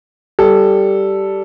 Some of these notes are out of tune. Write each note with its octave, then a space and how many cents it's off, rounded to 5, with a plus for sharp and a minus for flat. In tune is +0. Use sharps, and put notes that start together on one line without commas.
G3 -10 A4 +0